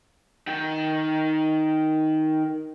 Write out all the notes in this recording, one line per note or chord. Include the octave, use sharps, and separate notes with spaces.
D#3 G5